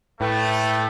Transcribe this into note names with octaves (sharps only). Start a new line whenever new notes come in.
A2 A3 B4 G5